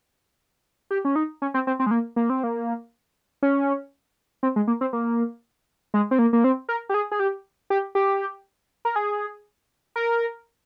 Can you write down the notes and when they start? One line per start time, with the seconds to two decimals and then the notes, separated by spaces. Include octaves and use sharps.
0.91 G4
1.05 C#4
1.16 D#4
1.42 C#4
1.54 C4
1.67 C4
1.80 C4
1.86 G#3
1.91 A#3
2.16 A#3
2.30 C4
2.43 A#3
3.42 C#4
4.43 C4
4.56 G#3
4.67 A#3
4.81 C4
4.93 A#3
5.94 G#3
6.11 C4
6.19 A#3
6.33 A#3
6.44 C4
6.69 A#4
6.89 G4
6.94 G#4
7.12 G#4
7.20 G4
7.70 G4
7.95 G4
8.85 A#4
8.96 G#4
9.96 A#4